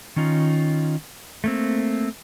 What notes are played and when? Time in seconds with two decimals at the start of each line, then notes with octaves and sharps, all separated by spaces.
0.16 D#3 C#4 D#4 F4
1.44 A3 A#3 C4